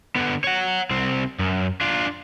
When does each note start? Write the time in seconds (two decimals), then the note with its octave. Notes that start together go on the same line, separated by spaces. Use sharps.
0.16 D3 B3
0.44 C#5 F#5
0.91 C2 C4
1.39 F#2
1.81 D4 F4